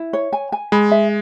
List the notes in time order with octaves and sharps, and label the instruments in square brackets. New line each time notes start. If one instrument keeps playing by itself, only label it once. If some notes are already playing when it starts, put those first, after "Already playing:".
Already playing: [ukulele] E4
C#5
G#5
G#5
[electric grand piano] G#3 [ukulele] B5
[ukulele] E5